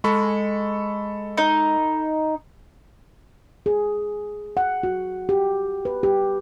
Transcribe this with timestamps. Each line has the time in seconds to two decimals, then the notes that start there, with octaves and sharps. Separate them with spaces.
0.04 G#3 A4 B5 C#6
1.38 D#4
3.66 G#4
4.57 F#5
4.83 F#4
5.29 G4
5.85 B4
6.03 G4